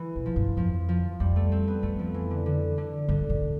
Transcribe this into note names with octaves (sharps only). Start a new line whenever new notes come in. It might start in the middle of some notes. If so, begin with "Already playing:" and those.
Already playing: E3
B2
F3
G2
F2 F3
F3
F2 G3
A3
C4
B3
F2 A3
F3
E3
D3
D3
D3
G2 D3
A2